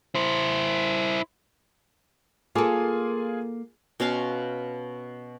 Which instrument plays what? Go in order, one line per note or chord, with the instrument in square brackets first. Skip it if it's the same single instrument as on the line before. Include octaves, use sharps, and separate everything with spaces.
[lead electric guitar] E4 C5
[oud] A#3 A4 [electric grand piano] F4 G#4 G#5
[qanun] B2 C#4 F5 C6